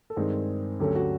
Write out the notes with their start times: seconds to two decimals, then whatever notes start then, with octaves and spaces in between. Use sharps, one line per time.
0.10 A4
0.16 G2 D#3 G#3 C4 G#4
0.79 D2 D3 F#3 A3 C#4 G4
0.96 F#4